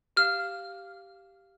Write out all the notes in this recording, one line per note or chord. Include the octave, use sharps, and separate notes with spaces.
G4 F5 F6